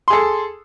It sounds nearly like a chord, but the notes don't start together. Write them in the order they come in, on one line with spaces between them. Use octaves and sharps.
C6 G#4 A4